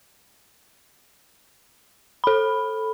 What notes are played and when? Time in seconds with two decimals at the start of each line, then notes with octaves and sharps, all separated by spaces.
2.24 A4 B5